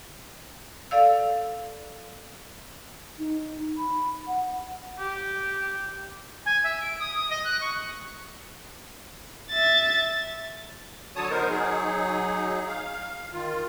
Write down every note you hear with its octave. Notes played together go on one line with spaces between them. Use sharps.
A4 D5 F5 E6
D#4
B5
F#5
G4
G#5
E5
D7
D#6
D#6
D#5
F#6
C#6
E5 A6
D3 F#3 C#5 A5 D#6
B3 D#4 A#4 C5
F#3 D#4 G#4
F5
D#3 F4